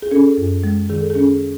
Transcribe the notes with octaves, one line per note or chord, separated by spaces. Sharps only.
G#4
C#4 A4
F#2
G#3
D#3 G#4
A4
G#4
C#4